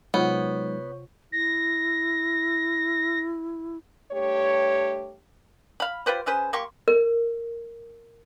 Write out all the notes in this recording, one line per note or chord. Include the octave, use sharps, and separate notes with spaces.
C3 F#3 G#3 B3 D#4 F4 C#5 F#5
E4 A#6
G2 A3 G4 C#5
F5 B5
F4 G4 B4 C5
C#4 G#4 B4 C5
A#3 G4 C6 C#6
A#4